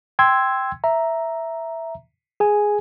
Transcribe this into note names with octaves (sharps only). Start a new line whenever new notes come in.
G5 C6 E6 G#6
E5 A#5
G#4 G#5